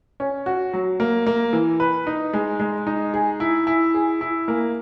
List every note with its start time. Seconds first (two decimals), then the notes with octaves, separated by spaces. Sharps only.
0.20 C#4
0.46 F#4
0.73 F#3
1.00 A#3
1.26 A#3
1.53 E3
1.80 B4
2.07 D#4
2.33 G#3
2.60 G#3
2.87 D#4
3.14 G#4
3.40 E4
3.67 E4
3.95 G#4
4.21 E4
4.48 A#3